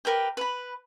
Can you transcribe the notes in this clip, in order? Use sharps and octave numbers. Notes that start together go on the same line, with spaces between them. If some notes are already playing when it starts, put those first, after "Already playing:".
G4 A#4 B4 G5
B4 B5